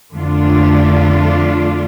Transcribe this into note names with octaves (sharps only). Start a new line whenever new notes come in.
F2 D3 A3 D4 F4